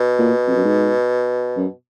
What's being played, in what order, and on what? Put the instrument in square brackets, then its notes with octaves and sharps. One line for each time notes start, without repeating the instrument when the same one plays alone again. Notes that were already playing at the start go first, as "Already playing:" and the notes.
Already playing: [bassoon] B2
[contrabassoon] A#2
F2
F#2
G#2
F#2